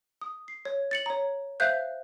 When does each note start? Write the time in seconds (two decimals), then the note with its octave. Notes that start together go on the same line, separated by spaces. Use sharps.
0.21 D#6
0.48 C7
0.65 C#5
0.91 A6 C#7 F#7
1.06 C#5 A#5
1.60 C5 E5 F5 F#6 G6